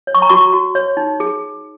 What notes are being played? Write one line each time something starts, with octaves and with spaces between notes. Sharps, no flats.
C#5
C#6
A#5
F#4 C#6
F#4
C#5
D#4
G#4